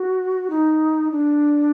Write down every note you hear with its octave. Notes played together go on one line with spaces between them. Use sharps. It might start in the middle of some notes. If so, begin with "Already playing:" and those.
Already playing: F#4
D#4
D4